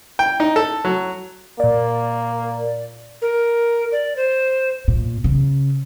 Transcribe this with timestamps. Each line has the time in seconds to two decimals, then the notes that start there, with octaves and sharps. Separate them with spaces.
0.19 G5
0.40 D#4
0.56 A4
0.85 F#3
1.60 A#2 A#3 D5
3.22 A#4
3.92 D5
4.17 C5
4.88 A#2
5.24 C#3